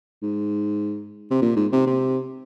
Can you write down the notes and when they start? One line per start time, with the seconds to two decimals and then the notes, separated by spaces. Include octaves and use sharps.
0.22 G#2
1.31 C3
1.42 A#2
1.56 G#2
1.72 C3
1.87 C3